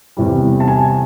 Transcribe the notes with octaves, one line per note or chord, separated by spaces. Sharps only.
E2 C3 E3 G3
A5
G#5